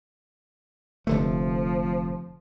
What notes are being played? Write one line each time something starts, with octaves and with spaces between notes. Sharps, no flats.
F1 D3 F3 A3